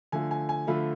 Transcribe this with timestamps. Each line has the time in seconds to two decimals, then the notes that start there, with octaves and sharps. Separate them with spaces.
0.12 D3 F3 A3 F4 G#5
0.31 G#5
0.49 G#5
0.67 D3 F3 A3 F4 B5